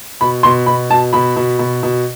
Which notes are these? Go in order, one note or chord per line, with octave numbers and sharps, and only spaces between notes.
B2 B5
B2 C6
B2 B5
B2 A5
B2 B5
B2
B2
B2